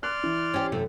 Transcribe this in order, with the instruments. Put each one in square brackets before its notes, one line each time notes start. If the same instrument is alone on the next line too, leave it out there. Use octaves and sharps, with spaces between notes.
[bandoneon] D5 C6 F6 [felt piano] F#6
[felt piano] E3
[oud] C#4 G4
F#2 C3 A3